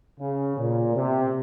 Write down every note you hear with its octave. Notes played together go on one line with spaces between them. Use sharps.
C#3
A#2
C3